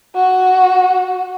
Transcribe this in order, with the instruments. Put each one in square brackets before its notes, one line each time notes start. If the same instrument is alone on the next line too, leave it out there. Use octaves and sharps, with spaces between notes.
[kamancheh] F#4